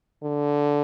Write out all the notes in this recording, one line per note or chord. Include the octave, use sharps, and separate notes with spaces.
D3